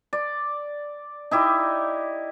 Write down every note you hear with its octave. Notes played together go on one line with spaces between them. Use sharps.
D5
D#4 E4 G4 D5